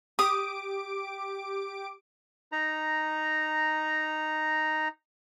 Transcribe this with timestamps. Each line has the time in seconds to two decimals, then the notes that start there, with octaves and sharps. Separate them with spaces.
0.19 G4 D6 D#6 D7
2.52 D#4 A#5